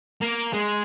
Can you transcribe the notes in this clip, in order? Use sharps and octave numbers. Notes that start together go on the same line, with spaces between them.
A#3
G#3